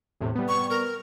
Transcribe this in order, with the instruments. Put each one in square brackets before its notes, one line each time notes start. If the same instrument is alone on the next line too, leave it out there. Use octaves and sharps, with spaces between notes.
[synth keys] E2 A2 C3
G3 B3
[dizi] C#6
A#4